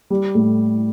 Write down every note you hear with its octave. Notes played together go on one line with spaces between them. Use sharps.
G3
A2